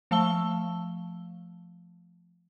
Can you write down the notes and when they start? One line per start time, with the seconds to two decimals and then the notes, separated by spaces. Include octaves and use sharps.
0.11 F3 A3 F5 A5 E6 G7